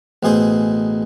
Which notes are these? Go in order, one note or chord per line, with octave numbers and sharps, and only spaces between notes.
A1 B2 G#4 C5